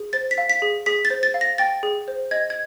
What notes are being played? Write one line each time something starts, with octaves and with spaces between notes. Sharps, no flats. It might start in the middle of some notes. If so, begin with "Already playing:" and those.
Already playing: G#4
C5 A6
B6
F5
B6
G#4
G#4 B6
A6
C5
A6
F5
A#6
G5 A6
G#4
C5
D#5 G#6
G#6